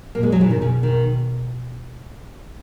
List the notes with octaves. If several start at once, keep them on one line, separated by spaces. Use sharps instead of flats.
A#2 A#3
G#3
F#3
E3
B2 D#3
C#3
D#3